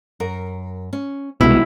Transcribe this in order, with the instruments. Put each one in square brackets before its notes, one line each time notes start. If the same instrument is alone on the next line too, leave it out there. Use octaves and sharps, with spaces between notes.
[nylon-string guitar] F#2 A#4
C#4
[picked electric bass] C2 B2 [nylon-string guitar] E3 G#3 [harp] E4